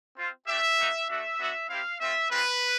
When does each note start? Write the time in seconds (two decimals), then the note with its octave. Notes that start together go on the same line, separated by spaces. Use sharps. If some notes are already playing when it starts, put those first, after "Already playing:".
0.17 C4 F4
0.48 A3 D4 G4 E5
0.78 A#3 D#4 F#4
1.09 A3 D4 F#4 E5
1.39 B3 D4 F#4
1.69 C4 E4 G4 F5
2.01 A3 C4 F4 E5
2.31 G#3 C4 F4 B4